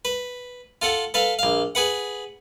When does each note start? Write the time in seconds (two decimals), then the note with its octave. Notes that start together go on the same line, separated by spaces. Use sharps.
0.05 B4
0.82 F4 A4 F#5
1.14 A4 B4 F5
1.39 A#1 F5
1.75 G#4 B4 F#5